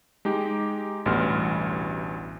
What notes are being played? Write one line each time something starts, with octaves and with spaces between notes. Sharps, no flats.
G#3 D#4 G4
A1 D2 B2 G3 C6 F6